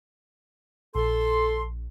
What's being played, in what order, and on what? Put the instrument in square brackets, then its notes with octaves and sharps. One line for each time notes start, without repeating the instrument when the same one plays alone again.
[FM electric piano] A#1 [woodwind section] A4 C6